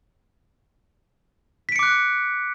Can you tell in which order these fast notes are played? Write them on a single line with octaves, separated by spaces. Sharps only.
B6 D7 C#7 D6 F#6